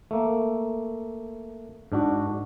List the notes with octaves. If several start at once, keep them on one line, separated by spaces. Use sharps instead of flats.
A3 A#3
G#2 D4 F#4